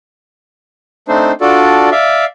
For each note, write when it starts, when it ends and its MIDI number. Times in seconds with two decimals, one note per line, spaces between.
1.08 1.32 57
1.08 1.32 60
1.08 1.32 62
1.08 1.32 63
1.08 1.32 72
1.41 1.90 62
1.41 1.90 65
1.41 1.90 66
1.41 1.90 69
1.41 1.90 74
1.91 2.25 74
1.91 2.25 76
1.91 2.25 77